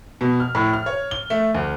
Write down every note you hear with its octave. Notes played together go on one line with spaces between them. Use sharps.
B2
F6
A2
F6
C#5
G7
A3
D2